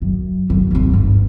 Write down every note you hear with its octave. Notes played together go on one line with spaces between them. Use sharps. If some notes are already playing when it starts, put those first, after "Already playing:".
F#2
F#2
G#1 D#2
G2